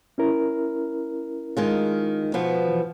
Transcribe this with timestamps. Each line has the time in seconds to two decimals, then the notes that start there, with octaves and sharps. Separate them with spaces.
0.18 C#4 E4 A#4
1.57 D#3 G#3 F4
2.34 B2 F3 B3
2.69 E3